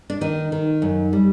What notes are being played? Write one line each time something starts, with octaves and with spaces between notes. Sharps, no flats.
D4
D#3 D#4
D#3
F#2
G3